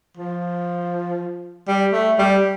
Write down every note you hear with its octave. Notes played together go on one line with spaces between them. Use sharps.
F3
G3
A3
G3